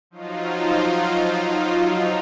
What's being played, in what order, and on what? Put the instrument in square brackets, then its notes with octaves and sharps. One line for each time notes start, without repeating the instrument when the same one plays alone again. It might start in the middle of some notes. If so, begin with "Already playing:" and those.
[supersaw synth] F3 F#3 D#4 F4